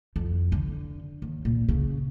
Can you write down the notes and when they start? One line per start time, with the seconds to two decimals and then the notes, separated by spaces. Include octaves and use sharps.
0.16 F2
0.52 D3
1.22 D#2
1.45 A#2
1.69 C#3